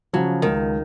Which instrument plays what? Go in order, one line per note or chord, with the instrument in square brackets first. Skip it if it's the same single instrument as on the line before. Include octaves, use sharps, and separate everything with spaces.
[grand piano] C#3 F3 [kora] F#3
[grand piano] C#2 [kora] D#3